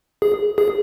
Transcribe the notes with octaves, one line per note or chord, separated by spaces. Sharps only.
G#4
G#4